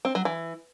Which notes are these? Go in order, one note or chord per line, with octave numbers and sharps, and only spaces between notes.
C4
F#3
E3